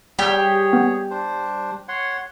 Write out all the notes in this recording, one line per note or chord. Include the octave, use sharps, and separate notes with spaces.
G3 G4 G#4 C#5
B3
D4 C5
C#5 F#5 C6